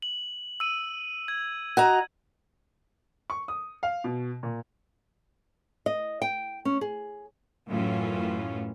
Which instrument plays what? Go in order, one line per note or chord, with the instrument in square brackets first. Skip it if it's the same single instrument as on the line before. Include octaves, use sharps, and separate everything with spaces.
[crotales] F#7
E6 D#7
G#6
[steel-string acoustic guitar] F#4 D#5 A#5
[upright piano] C#6
D#6
F5
B2
A#2
[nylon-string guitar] D#5
G5
C#4
G#4
[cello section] F#2 A2 E3 F#3 C#4 F4